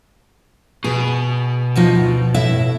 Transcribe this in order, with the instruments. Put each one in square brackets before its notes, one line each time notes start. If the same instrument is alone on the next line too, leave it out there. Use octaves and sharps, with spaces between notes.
[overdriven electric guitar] B2 [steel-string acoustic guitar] G#4
[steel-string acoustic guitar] D2 F3 D#4
A2 E4 E5